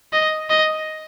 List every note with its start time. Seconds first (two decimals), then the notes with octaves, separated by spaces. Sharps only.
0.13 D#5
0.50 D#5